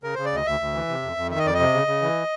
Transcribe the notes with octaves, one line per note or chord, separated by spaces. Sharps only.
C#3 A#4
C#3 C5
D5
D2 D#5
D2 E5
D2
E3
C3
F2
F2
D#3 E5
D#5
F2 D5
D#5
C3
C#3
C#3
E3